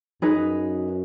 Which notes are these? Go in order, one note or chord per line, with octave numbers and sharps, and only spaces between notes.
F#2 D#4 G#4 B4